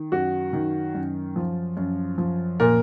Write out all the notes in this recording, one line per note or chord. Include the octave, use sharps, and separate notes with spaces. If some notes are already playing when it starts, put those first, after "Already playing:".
Already playing: D#3
F#2 F#4
D#3
F#2
F3
F#2
F3
A#2 A#4